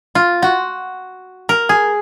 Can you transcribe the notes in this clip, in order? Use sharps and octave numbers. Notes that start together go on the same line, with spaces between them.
F4
F#4
A#4
G#4